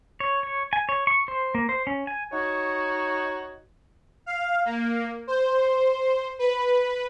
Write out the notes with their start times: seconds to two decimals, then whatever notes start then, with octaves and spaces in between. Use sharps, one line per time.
0.20 C#5
0.43 C#5
0.73 G#5
0.89 C#5
1.07 C#6
1.28 C5
1.55 A#3
1.69 C5
1.87 C#4
2.07 G#5
2.32 D#4 F#4 C#5
4.26 F5
4.65 A#3
5.27 C5
6.39 B4